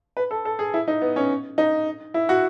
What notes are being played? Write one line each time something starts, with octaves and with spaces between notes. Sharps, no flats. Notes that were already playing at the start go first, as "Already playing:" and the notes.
B4
A4
A4
G#4
E4
D#4
B3
C#4
D#4
E4
F#4